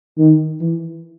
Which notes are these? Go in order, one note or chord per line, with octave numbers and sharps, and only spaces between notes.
D#3
E3